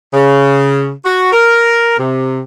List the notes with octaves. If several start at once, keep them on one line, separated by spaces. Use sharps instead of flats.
C#3
F#4
A#4
C3